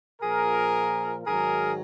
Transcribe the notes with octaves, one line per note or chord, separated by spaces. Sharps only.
A#2 F3 G#4 A#4
G#2 D#3 F#3 G#4 A#4